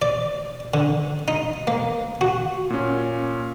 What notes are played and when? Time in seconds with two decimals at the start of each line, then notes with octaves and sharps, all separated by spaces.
0.02 D5
0.74 D3
1.28 D#4
1.67 A#3
2.21 F#4
2.70 A#2 C#4